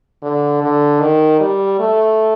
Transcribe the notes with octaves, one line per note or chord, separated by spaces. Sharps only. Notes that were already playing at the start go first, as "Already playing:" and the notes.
D3
D3
D#3
G3
A3